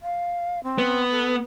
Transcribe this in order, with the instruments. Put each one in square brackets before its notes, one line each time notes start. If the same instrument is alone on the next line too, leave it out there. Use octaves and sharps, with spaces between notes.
[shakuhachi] F5
C4
[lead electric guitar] B3
[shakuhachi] A4